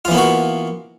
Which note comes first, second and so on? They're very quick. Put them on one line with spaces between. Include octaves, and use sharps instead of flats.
F4 E3 A#3 B3 F#4